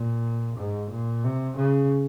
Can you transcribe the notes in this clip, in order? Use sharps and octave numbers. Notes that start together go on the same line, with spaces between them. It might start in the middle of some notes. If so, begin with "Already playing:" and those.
Already playing: A#2
G#2
A#2
C3
C#3